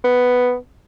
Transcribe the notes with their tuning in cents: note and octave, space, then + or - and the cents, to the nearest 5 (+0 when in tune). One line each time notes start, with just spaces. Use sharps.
B3 +5